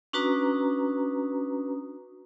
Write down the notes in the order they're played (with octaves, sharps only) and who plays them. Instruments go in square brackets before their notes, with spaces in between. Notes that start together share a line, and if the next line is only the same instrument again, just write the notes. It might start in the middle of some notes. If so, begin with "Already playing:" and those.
[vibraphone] C#4 D4 F#4 B4 A#5 D#6